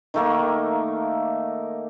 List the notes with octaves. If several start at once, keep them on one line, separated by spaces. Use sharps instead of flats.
D#3 A3 A#3